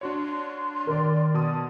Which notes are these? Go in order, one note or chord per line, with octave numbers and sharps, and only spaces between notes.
D4 F#4 C#5 C6
D#3 A#4 D5
B2 A5 D#6